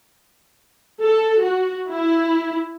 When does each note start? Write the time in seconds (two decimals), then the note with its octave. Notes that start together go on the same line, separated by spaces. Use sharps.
1.02 A4
1.41 F#4
1.90 E4